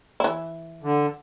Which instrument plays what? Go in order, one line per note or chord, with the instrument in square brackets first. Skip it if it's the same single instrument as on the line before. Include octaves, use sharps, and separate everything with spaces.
[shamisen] E3 E4
[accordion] D3